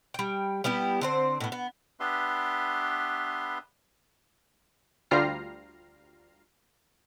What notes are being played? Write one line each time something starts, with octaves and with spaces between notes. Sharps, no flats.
G3 G5
G3 B3 E4 G4
D3 C4 C5
A2 B3
B3
B3 D4 G4 B4 E5 C6
D2 G3 F4 A#5 F6 C7